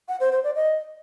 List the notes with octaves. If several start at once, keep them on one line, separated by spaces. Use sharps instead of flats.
F#5
C5
C5
D5
D#5